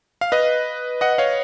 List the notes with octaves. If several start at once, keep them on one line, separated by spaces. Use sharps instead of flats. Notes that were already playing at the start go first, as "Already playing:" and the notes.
F5
B4 D#5
D#5 F#5
C#5 F5